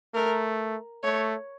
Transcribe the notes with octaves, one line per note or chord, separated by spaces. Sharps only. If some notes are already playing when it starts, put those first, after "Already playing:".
A3 A#4
A3 C#5